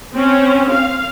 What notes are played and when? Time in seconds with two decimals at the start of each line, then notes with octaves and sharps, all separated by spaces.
0.14 C4 C#4
0.73 F5